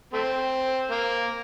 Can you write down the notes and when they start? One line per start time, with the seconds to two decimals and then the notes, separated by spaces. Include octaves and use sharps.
0.13 A3 C4
0.91 A#3